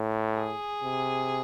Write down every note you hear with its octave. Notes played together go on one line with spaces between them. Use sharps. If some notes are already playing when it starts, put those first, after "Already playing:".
Already playing: A2
G#4
C3